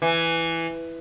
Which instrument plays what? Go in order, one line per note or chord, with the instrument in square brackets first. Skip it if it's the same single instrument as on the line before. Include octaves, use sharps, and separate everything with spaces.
[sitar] E3